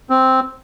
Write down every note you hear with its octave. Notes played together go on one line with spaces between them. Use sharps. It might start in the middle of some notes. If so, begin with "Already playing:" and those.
C4